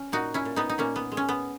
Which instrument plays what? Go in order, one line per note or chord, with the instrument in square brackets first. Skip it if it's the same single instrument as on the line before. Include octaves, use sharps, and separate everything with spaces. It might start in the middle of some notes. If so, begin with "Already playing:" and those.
Already playing: [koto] C#4
A#2 D#4 F#4
C#4 E4
A#2
B3 D#4
D#4
A#2 A#3 C#4
B3
G#3
C#4
B3